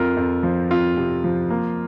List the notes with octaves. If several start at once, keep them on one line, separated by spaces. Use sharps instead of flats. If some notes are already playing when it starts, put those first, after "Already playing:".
Already playing: F2 F4 A#4
F2
F3
F2 F4
C3
F3
A#3